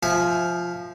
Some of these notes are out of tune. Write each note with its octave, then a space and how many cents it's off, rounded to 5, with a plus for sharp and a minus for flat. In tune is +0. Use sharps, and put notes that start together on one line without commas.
F3 +0 E5 +0 G#5 +25